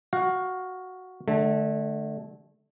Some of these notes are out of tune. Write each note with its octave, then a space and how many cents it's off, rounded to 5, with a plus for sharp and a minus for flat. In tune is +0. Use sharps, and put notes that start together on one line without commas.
F#4 +0 F5 +20
D3 +15 A3 -25